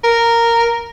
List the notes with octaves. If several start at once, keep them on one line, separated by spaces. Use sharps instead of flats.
A#4